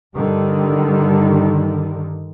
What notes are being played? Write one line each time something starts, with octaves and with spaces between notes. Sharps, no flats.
G2 D3 D#3 G3